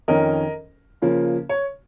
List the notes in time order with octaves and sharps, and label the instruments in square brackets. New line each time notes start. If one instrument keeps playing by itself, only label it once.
[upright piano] F2 D#3 C#4 A#4 D#5
C#3 F3 A#3 C#4
C#5